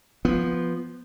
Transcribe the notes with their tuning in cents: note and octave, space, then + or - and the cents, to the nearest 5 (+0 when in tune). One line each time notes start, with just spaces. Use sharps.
F3 -5 B3 +0